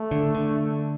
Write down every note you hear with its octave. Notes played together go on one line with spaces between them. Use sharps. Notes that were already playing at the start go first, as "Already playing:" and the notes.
Already playing: A3
D3
D3